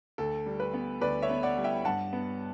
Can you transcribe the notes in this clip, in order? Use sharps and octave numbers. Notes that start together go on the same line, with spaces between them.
D2 A4
G3
B4
B3
D2 B4 D5
C#5 E5
B3
D5 F#5
G3
E5 G5
G2 F#5 A5
B3